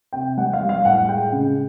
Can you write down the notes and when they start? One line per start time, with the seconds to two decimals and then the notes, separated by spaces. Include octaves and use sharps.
0.13 C3 G5
0.37 G3 F#5
0.53 F5
0.61 G3
0.69 F5
0.85 A2 F#5
1.08 G#3 G5
1.33 C#3